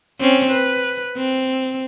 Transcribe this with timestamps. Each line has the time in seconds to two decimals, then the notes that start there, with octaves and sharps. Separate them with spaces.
0.20 C4 C#4
0.52 B4
1.17 C4